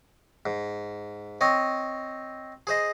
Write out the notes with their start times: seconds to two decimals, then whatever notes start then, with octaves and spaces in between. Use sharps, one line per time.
0.46 G#2
1.41 C4 C#5 D#5
2.67 G#4 C5 D#5